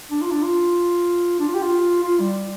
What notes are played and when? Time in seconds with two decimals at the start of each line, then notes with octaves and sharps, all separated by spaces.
0.10 D4
0.21 F4
0.31 D4
0.43 F4
1.40 D4
1.48 F4
1.55 G4
1.63 F4
2.03 F4
2.19 G3